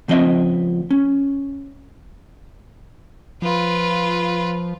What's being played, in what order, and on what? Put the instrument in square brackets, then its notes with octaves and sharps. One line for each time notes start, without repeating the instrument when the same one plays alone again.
[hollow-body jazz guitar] C#2 F3 C4 D#5 E5
C#4
[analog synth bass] F3 [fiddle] F4 B4